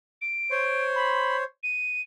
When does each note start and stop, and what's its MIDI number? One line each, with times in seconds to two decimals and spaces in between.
0.22 0.84 98
0.51 1.44 72
0.51 1.44 73
0.51 1.44 84
0.96 1.37 83
1.63 2.02 99